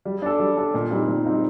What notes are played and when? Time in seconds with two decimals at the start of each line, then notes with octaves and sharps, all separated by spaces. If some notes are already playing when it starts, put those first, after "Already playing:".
0.05 G3
0.22 D4 A4
0.40 G3
0.57 D4 A4
0.74 A#2
0.91 G3 C4 D#4
1.08 A#2
1.25 G3 C4 D#4